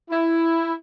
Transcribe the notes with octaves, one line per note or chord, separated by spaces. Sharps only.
E4